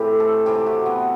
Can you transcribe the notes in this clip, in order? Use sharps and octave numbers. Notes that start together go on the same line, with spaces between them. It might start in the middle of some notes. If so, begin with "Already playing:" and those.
Already playing: A2 E3 A3 C4 G4
A4
C3 E3 A3 G4
F#4
B3